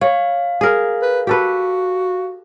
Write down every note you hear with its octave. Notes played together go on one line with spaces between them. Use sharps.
C#5 F5
G#4 A#4
B4
F#4 G4 A4 B4